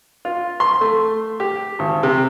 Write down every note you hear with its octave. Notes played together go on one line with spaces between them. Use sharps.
F4
C6
A3
G4
G#1
C3